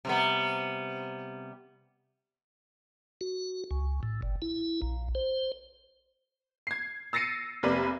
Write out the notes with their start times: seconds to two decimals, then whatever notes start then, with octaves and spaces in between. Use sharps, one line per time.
0.05 C3 G3 B3
3.21 F#4
3.71 C#2
4.03 A2
4.22 G1
4.42 E4
4.82 A#1
5.15 C5
6.67 G#6 C7
7.13 E6 A6 A#6 C7 C#7 D#7
7.63 F1 C3 A#3 B4 D5 B5